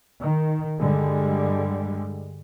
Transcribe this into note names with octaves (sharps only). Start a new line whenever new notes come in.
D#3
G2 D3 G3 G#3